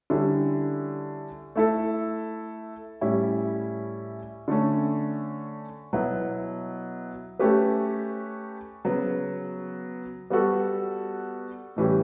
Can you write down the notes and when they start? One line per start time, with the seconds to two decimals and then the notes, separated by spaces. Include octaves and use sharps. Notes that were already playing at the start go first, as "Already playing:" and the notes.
0.10 D3 G3 C#4 E4
1.56 A3 E4 A4
3.01 A2 G3 C#4 E4
4.48 D3 A3 C#4
5.93 B2 F#3 B3 E4
7.39 A3 C#4 G4 B4
8.85 C#3 F#3 B3
10.30 G3 B3 F#4 A4
11.76 A2 E3 G3 C#4 G4